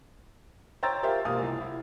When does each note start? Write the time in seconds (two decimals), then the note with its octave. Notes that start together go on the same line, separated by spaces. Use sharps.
0.83 C5 C#5 G5 A#5 E6 A6
1.03 G4 A#4 C5 E5 F5
1.25 E1 A#3 G4 F5 D#6
1.42 C2
1.61 E4